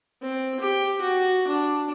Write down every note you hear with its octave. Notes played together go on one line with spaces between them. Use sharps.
C4
G4
F#4
D4